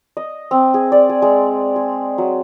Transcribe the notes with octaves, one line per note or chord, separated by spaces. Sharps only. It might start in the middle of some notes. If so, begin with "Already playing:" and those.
D#5
C4
G#4
D5
G#4
G#3
G#4
F#3